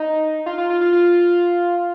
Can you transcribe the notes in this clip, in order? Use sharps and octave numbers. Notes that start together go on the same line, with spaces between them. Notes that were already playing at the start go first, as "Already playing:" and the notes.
Already playing: D#4
F4
F4
F4
F4
F4